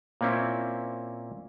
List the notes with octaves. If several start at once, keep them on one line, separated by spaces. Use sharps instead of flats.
A#2 A#3 C4 C#4 E4